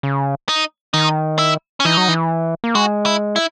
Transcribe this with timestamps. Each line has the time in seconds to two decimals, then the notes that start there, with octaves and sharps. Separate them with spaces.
0.03 C#3
0.49 D#4
0.94 D#3 D#4
1.39 E4
1.80 C#4
1.85 E3 D#4
1.97 F#3
2.08 E3
2.64 A#3
2.75 G#3 F#4
3.06 E4
3.36 E4